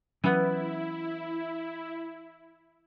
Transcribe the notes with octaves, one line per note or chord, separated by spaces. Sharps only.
E3 F#3 B3 C#4 E4